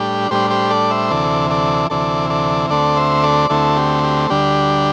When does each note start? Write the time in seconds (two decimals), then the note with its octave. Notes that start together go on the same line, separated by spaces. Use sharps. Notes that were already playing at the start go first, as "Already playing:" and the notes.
Already playing: A2 G3 D4 G4
0.31 A2 G3 D4 G4 C5
0.50 G4 C5
0.70 A4 D5
0.90 C5 E5
1.10 D2 C3 E3 A4 D5
1.51 A4 D5
1.90 D2 C3 E3 A4 D5
2.30 A4 D5
2.70 D2 D3 A3 C4 A4 D5
2.96 C5 E5
3.23 A4 D5
3.49 D2 D3 A3 C4 E4 A4
3.77 G4
4.04 G4
4.30 D2 D3 G3 D4 G4